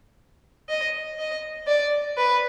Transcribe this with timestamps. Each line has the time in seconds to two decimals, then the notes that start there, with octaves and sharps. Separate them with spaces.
0.69 D#5
1.19 D#5
1.67 D5
2.17 B4